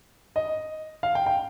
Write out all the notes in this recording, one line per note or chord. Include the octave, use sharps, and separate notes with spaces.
D#5
F5
G5
G5